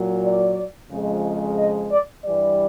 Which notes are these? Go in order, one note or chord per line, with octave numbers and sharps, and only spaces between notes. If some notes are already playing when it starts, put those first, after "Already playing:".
Already playing: A#2 F#3
D5
F2 C#3 F3 G#3
D#5
D5
G2 E3 G3 D5